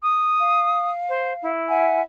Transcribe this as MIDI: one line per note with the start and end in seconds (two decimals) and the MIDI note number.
0.02 0.91 87
0.39 1.51 77
1.09 1.33 72
1.42 2.00 64
1.69 2.02 76
1.69 2.02 78
1.69 2.02 80